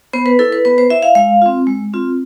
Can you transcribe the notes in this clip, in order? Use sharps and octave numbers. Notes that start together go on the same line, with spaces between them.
B3 C5
B4
E4 A4
B4
B3 B4
C5
E4 E5
F5
G#3 F5
C4 F4
G#3
C4 F4